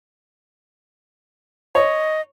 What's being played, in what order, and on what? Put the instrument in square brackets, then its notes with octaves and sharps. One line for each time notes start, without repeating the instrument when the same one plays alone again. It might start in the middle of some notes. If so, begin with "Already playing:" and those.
[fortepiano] C#5 [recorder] D#5